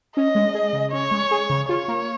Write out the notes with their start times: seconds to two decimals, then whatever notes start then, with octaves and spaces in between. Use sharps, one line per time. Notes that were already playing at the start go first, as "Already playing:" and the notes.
0.16 C#4 D#5
0.35 G#3
0.54 G#4
0.73 C#3
0.92 C#4 C#5
1.11 G#3
1.31 G#4
1.50 C#3
1.69 F4 C#5
1.88 A#3